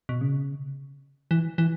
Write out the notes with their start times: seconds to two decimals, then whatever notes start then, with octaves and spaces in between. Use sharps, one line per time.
0.09 B2
0.21 C#3
1.31 E3
1.58 E3